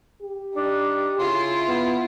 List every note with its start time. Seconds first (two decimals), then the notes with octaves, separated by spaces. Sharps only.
0.22 G4
0.54 D4 D#4
1.19 C#3 E4 F4 C6
1.67 B3